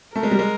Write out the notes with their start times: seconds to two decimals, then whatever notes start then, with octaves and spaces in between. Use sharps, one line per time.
0.15 A3 A#4
0.23 G#3
0.31 G3
0.39 G#3